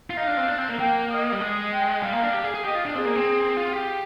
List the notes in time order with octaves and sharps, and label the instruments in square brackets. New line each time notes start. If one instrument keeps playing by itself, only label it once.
[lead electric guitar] F4
[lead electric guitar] D#4 [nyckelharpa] F5
[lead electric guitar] D4
C4
D4
C4
A#3
[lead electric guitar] A#3 [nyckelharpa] G5
[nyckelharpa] D#5
[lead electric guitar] G3
G#3
[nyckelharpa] G5
[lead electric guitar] G3 [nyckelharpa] F5
[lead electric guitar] A#3
D4
G4
G#4
G#4
[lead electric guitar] G4 [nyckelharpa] D#5
[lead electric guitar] F4
D4
[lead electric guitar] C4 [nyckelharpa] G#4
[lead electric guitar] A#3
C4
F4
G4